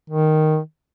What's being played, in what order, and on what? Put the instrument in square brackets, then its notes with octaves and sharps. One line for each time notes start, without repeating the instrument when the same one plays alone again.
[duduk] D#3